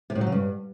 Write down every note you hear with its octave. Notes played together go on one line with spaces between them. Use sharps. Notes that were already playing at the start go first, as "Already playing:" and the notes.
C3
A2
F#3
C#3
G2